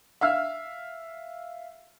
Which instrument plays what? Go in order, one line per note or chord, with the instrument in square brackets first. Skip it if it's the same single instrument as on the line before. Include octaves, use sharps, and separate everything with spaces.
[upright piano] E5 F5 E6 F6